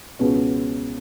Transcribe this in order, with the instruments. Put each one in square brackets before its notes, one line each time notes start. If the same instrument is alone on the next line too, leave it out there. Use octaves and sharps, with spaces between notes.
[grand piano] C#2 B2 G#3 B3 C#4